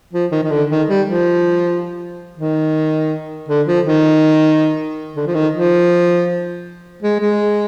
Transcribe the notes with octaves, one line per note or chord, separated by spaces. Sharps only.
F3
D#3
D#3
D3
D#3
G3
F3
D#3
D3
F3
D#3
D3
F3
D#3
F3
G#3
G#3